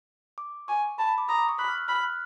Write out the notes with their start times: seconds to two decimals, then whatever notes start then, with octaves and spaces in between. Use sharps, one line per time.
0.38 D6
0.68 G#5 C#6
0.98 A5 B5
1.08 B5
1.18 D6
1.29 A#5 D#6
1.39 D6
1.49 C#6
1.59 B5 F#6
1.68 F6
1.78 E6
1.88 B5 F6
2.03 F#6